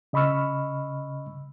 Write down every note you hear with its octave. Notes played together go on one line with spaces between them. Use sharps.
C#3 D#5 B5 C#6 E6 F6